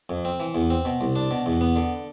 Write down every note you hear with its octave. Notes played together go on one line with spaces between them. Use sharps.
F2
C4
E3
E2
C4
B2
C2
D4
B2
E2
B3
D3